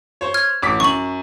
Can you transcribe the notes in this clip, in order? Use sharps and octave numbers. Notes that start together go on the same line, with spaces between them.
C5 C#5
F6 G#6
A1 D6 B6
F#2 C#6 F#7